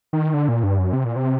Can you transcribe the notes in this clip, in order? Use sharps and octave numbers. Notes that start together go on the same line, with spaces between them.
D#3
D3
A#2
G2
F#2
C3
A#2
C3